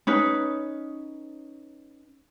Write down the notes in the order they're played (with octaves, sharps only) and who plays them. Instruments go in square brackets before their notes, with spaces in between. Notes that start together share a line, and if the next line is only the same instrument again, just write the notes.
[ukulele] C#4 D#4 B4